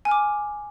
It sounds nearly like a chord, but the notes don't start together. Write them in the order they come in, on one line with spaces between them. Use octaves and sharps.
G#5 F6 D6